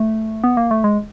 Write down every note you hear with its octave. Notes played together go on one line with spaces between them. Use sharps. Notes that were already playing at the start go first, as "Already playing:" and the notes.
Already playing: A3
B3
A#3
A3
G#3